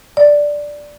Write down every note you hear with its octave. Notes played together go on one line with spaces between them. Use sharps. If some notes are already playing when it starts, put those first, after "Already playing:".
D5